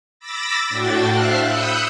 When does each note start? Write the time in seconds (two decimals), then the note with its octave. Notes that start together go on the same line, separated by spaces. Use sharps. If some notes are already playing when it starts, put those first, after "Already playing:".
0.20 B5 D6 E6 A6 A#6
0.68 A2 D4 F#4 G5 A6
1.09 C5 E5 F5 C6 F6 F#6
1.46 B5 D#6 E6 F#6 G6 C#7